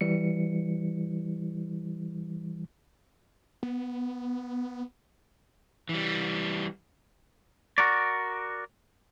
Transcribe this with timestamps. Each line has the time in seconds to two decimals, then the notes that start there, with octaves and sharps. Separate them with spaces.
0.01 E3 G3 C#7
3.63 B3
5.89 E3 G3
7.78 F#4 A#4 D5